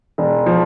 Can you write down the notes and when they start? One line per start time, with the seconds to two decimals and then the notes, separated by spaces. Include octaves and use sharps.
0.18 E1
0.46 F3